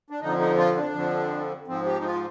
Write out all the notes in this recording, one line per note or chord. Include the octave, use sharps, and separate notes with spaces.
D4
F2 D3 F3 D#4
D#4
F4
D4
F2 D3 F3
G#2 F3 C4
G4
D#4
F4